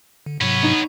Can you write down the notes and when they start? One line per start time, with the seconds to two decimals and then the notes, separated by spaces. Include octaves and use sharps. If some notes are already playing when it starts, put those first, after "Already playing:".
0.26 D3
0.41 G#2 C3 F#3 B3 C#5
0.63 D#4